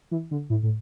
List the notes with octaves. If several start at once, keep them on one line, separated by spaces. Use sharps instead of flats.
E3
D3
A2
A2